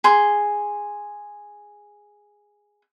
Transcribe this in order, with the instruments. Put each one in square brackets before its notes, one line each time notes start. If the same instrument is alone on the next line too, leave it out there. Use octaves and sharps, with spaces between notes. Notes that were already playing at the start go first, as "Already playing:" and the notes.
[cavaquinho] G#4 C6